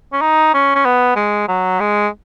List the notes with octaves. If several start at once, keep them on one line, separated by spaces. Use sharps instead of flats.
C#4
D#4
C#4
C#4
B3
G#3
F#3
G#3